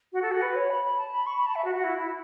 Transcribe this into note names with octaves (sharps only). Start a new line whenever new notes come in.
F#4
A4
F#4
B4
C#5
B5
B5
A5
B5
C#6
B5
A5
E5
F#4
F#4
E4
E4